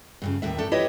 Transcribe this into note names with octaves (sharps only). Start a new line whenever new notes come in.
G2 A#2 C#3
D#2 A2 E5
A3 D4 G4 A4
E4 G4 B4 C#5 D#5